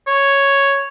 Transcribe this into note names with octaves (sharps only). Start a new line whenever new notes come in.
C#5